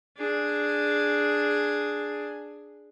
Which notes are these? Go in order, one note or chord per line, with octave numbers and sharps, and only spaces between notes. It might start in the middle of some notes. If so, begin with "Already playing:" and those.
D4 G#4